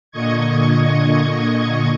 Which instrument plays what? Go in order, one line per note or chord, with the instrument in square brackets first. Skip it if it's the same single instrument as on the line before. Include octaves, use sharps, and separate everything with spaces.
[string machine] A#2 D3 D#5 C#6 G#6